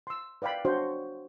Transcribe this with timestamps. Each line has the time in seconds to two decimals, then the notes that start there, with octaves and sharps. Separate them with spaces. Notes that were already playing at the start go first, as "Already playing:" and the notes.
0.07 C6 E6
0.42 B4 D5 F5 G5 B5
0.65 D4 F#4 C5 C#5